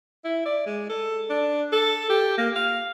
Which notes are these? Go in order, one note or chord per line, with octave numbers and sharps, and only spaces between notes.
E4
D5
G#3
A4
D4
A4
G4
A#3
F5